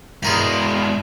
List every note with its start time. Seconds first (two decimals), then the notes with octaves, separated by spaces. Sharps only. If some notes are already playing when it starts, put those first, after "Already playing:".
0.23 E2 G2 B2 G#3 G#4 A#4 G#5 C6